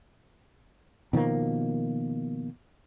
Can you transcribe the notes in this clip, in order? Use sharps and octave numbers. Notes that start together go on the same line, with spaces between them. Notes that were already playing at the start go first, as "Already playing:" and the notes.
B2 D#3 F3 A#3